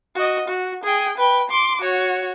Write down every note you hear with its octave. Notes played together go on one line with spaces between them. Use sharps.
F#4 D#5
F#4
G#4 G5
B4 G5
C6 D6
F#4 C#5